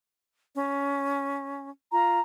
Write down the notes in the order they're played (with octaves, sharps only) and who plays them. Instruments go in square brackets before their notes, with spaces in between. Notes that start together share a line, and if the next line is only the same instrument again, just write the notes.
[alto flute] C#4
[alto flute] F4 [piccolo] A#5